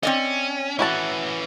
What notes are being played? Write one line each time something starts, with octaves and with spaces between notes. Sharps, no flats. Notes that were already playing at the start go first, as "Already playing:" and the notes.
C4 C#4 D5 D#5
E3 C#4 E4 F#4 A5